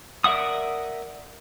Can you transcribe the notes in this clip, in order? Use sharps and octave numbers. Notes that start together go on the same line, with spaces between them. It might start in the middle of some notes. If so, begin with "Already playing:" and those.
A#4 D5 E5 F#5 D#6